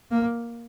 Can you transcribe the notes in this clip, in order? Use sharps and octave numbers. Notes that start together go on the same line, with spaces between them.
A#3